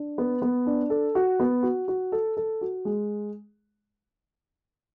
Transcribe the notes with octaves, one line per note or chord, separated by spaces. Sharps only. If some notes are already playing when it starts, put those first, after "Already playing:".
Already playing: D4
B3
B3
D4
A4
F#4
B3
F#4
F#4
A4
A4
F#4
G#3